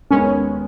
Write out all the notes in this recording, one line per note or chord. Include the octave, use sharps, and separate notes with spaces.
D#2 D#3 G#3 B3 C#4